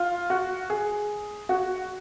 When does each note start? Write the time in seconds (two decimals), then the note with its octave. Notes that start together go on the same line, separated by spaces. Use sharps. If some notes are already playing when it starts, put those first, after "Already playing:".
Already playing: F4
0.30 F#4
0.70 G#4
1.49 F#4